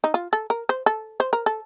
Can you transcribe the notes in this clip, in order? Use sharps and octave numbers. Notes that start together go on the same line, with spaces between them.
D#4
F4
A4
A#4
C5
A4
C5
A#4
A4